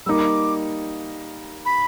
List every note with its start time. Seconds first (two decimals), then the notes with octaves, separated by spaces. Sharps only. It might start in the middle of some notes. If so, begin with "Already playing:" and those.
0.06 G3 A#3 D#4 D6 E6
1.65 B5